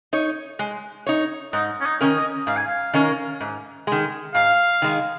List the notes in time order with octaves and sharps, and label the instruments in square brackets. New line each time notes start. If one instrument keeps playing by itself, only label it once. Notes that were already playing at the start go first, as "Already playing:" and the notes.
[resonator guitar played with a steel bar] D#4 C#5
G#3
D#4 C#5
[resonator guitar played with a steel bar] G#2 [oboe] D#4
[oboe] C#4
D#4
[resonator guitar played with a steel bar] D#3 C#4 A#4
[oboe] D#5
[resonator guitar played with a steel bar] G#2 [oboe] F5
[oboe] G#5
F5
[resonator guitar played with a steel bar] D#3 C#4 A#4
G#2
D#3 G#3
[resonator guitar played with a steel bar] G#2 [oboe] F5
[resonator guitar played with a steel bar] D#3 G#3